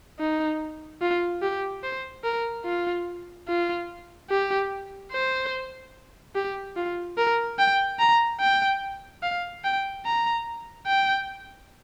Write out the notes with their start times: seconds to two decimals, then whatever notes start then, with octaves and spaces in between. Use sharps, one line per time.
0.19 D#4
1.01 F4
1.42 G4
1.83 C5
2.25 A#4
2.65 F4
3.48 F4
4.30 G4
5.12 C5
6.35 G4
6.76 F4
7.18 A#4
7.59 G5
7.99 A#5
8.40 G5
9.23 F5
9.64 G5
10.05 A#5
10.87 G5